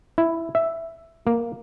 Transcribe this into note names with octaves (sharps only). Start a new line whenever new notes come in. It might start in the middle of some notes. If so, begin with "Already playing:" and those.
E4
E5
A#3